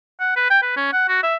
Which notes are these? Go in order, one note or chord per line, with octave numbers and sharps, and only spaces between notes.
F#5
B4
G5
B4
C#4
F#5
F#4
E5